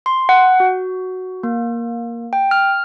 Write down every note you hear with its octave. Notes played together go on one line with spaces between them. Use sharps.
C6
F#5
F#4
A#3
G5
F6